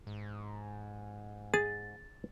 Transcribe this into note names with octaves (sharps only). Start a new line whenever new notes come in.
G#2
G#4 A6